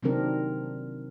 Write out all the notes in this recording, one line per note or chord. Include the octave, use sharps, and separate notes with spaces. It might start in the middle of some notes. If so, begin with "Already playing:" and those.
C3 D#3 F#3 C4 D4 A#4